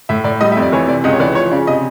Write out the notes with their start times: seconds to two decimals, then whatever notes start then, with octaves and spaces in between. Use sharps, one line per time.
0.09 A2 E5
0.24 A2 D5
0.41 G3 D#5
0.52 E5
0.57 F2
0.62 D5
0.72 E3 C#5
0.88 C3 D5
1.04 C#2 D#5
1.13 C#5
1.20 E3 D5
1.35 F3 C#5
1.51 C#3 D5
1.67 C3 D#5